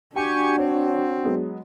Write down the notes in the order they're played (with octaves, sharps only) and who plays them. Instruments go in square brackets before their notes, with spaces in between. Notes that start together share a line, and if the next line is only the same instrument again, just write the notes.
[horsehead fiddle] D4 [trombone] F#4 [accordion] G4 G#5 C#6 [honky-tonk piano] G5
[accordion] C4 [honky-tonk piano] C#5
[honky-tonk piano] F#3 G#3 B3